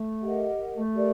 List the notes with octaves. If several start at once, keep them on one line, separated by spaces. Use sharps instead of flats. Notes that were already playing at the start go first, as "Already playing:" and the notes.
Already playing: A3
G4 A#4 D#5 F#5
A3
G4 A#4 D5